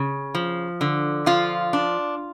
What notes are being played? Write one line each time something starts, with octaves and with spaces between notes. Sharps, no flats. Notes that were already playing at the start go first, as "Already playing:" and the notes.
Already playing: C#3
F3
D3
F3 F4
D4